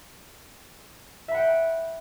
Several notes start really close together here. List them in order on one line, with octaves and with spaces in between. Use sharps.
E5 B5 F#5 G5